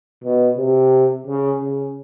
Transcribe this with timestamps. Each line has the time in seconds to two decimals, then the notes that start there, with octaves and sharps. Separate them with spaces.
0.24 B2
0.58 C3
1.27 C#3
1.61 C#3